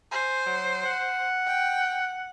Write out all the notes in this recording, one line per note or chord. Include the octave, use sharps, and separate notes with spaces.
C5 G#5
F#3
F#5
G5